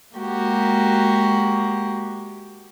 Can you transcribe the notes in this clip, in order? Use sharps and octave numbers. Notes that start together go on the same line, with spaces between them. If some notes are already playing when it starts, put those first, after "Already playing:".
G#3 A#3 F#4 G4